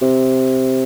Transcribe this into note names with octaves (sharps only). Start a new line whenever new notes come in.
C3